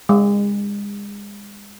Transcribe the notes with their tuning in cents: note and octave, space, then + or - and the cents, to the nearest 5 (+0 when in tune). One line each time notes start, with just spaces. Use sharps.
G#3 -35